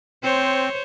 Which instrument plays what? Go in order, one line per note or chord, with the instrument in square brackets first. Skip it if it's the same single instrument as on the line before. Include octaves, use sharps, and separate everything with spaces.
[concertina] C4 [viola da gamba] C5 C#5